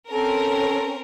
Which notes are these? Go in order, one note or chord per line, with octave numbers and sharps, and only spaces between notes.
C4 C#4 A4 A#4